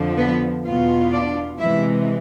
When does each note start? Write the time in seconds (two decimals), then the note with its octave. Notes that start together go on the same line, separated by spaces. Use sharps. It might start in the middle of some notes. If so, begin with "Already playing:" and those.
Already playing: F2 D3 F3
0.17 B3 B4
0.65 E2 B2 B3 F4
1.12 D4 D5
1.59 C3 E3 G#3 E4 E5